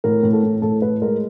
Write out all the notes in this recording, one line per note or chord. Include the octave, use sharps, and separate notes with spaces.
A2 A#4
A2
A4
A2
A2 A4
A2 B4
G#3 A#4